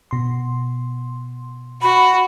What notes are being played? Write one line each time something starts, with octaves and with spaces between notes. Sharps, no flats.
B2 C6
F#4 B5